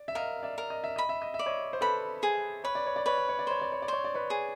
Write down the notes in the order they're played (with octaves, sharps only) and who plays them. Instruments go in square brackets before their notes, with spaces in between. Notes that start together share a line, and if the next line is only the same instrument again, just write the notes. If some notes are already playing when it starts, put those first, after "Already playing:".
Already playing: [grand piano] D5
E5
[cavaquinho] A#4 [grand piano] D#5 F5
[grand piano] D5 E5
[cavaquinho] A#4
[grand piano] D#5
E5
[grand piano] D#5 [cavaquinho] B5
[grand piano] E5
D#5
E5
[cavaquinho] D5
[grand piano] C#5 D#5
C5
[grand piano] A4 B4 [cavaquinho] B5
[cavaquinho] G#4
[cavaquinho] B4 [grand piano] C#5
[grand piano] D5
C#5
D5
[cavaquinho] B4 [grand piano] C#5
[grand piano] D5
C#5
D5
[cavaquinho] C5 [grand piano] C#5
[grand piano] D5
C#5
D5
[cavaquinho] C5 [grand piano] C#5
[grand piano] D5
B4 C#5
[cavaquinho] G#4